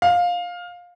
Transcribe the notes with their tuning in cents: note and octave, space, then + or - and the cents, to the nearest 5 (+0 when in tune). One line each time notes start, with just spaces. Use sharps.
F5 +15